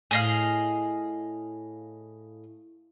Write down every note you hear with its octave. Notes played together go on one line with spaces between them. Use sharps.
A2 G#4 D#5 F5